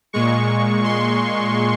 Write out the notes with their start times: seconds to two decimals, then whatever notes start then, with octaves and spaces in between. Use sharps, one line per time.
0.13 A#2 G#3 C#6
0.84 C6